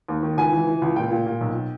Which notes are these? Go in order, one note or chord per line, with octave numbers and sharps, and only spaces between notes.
D#2
D#3
C#2 G#5
E3
E3
C#2
A#2 G5
A#2
A#2
B1